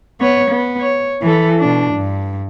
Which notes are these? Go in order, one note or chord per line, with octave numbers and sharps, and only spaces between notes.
B3 C#5
B3
C#5
E3 A4
B2 D4
G2